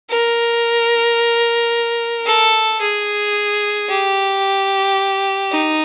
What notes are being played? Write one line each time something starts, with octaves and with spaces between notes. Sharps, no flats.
A#4
A4
G#4
G4
D#4